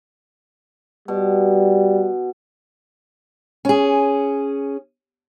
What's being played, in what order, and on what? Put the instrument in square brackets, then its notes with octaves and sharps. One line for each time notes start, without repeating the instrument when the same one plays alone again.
[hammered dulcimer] B2 [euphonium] G3
[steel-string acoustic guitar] C#4 G#4